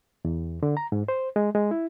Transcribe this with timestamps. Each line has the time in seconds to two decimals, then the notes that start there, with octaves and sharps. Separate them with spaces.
0.25 E2
0.63 D3
0.77 A#5
0.92 G#2
1.08 C5
1.36 G#3
1.55 G#3
1.71 E4